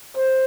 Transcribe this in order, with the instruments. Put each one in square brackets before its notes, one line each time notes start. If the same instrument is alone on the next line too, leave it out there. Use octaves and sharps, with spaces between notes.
[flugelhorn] C5